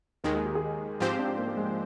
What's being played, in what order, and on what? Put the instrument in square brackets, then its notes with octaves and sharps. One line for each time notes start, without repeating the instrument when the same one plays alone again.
[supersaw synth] D#2 D#3 G#3 [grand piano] A#4
[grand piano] G#4
G4
G#4
[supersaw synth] G#2 F3 C4 G4 C5 [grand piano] F4
[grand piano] D4
A#3
A#3
G#3